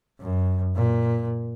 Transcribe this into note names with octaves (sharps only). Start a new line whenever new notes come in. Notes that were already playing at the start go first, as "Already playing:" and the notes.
F#2
A#2